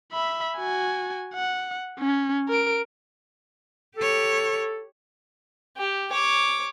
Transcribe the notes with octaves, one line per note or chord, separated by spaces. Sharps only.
E5 B5
F#4 G#5
F#5
C#4
A#4 D7
G4 A4 C#5
G4
C#5 D6